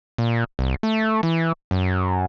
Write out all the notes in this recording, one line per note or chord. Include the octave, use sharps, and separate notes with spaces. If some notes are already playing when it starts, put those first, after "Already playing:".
A#2
C2
A3
E3
F#2